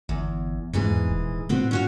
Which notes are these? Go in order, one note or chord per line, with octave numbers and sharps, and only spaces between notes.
G1 E2
E2 G#2 E3 G#4
D#1
A2 B3 C4 F#4
C#4 F#4 F5